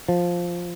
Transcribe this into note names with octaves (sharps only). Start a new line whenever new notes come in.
F3